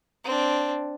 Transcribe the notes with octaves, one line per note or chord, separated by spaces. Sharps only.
C4 D4